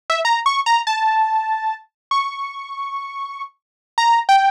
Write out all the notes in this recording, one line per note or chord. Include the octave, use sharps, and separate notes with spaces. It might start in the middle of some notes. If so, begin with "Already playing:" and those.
E5
A#5
C#6
A#5
A5
C#6
A#5
G5